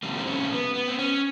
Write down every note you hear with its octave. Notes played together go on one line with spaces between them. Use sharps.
C3 D#3 G3 A#3
C4
C#4
B3
B3
C4
C#4